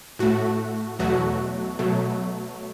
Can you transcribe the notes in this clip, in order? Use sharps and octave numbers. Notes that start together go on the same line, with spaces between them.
A2 A3 F#4
E2 B2 F#3 A3 F#4
B2 F#3 A3